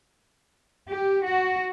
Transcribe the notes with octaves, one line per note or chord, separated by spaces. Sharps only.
G4
F#4